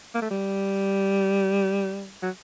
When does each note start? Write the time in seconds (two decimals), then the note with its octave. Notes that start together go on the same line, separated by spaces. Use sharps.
0.14 A#3
0.22 A3
0.31 G3
2.22 F#3